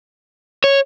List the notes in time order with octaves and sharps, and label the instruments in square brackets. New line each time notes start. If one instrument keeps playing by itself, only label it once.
[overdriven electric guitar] C#5